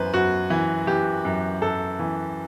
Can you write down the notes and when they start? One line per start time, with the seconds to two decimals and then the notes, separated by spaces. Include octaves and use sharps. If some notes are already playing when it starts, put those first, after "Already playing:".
Already playing: F#2 E3 B4 C5
0.14 F#2 F#4
0.50 E3
0.87 E3 G4
1.25 F#2
1.62 F#2 A4
1.99 E3